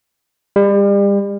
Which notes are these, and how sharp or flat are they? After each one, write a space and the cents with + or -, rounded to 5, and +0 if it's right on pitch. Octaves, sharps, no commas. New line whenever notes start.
G3 +35